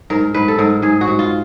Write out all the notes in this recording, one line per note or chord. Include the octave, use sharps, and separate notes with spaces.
G#2 A#4
G#2 B4
A4
G#2 A#4
G#2 G#4
F#4
G#2
F4